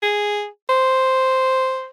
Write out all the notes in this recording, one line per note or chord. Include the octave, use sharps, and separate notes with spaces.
G#4
C5